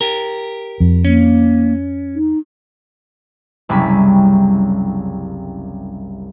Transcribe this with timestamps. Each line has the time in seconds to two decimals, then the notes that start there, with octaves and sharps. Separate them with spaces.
0.01 G4 A#4
0.80 F2
1.05 A#3 C#4
2.15 D#4
3.69 F#1 C2 G3 C#4 B5 B6